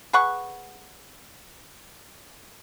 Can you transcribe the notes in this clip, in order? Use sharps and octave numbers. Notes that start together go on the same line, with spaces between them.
G#4 B4 F#5 C#6